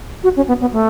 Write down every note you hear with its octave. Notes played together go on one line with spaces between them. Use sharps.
F#4
C#4
B3
B3
A3